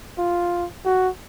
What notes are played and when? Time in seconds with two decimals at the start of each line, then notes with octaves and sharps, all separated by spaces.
0.18 F4
0.85 F#4